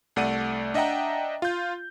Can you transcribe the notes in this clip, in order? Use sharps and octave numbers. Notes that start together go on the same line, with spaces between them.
C2 A3 D5 F#5 D#7
D4 D#5 E5 F#5 G5 A#5
F4 G6